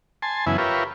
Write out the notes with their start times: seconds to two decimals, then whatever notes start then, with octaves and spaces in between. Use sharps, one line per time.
0.22 G#5 A5 C6
0.46 F#2 C#3 E3 B3 E4 G#5
0.58 F4 G4 A#4 B4 C#5 E5